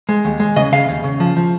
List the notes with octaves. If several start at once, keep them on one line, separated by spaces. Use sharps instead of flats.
G#3
D#2
G#3
C#3 D#5
C#3 F5
D#2
C#3
F3
F3